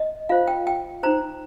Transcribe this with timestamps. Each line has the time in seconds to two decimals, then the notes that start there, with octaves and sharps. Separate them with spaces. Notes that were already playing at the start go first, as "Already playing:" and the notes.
Already playing: D#5
0.29 F4 C5 F5
0.47 G5
0.67 G5
1.03 D#4 C5 A#5